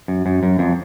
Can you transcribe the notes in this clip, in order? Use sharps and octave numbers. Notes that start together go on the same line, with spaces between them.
F#2
F#2
F#2
F2